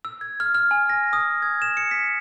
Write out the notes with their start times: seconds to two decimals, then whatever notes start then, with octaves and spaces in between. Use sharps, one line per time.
0.05 E6
0.21 G#6
0.40 F6
0.54 F6
0.71 G#5
0.90 A#6
1.13 D#6
1.42 G#6
1.62 E7
1.77 C#7
1.91 B6